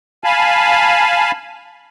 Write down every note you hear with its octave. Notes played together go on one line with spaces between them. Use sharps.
F5 G#5 A5 B5